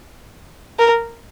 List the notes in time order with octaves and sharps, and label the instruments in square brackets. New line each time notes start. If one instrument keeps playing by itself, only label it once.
[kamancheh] A#4